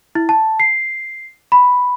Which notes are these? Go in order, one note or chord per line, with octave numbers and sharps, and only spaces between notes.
E4
A5
C7
B5